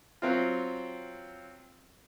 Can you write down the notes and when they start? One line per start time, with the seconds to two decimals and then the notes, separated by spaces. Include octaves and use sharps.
0.22 F#3 C4 F4